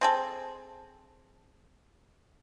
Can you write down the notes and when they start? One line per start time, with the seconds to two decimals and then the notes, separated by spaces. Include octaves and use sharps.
0.01 C4 G#4 A4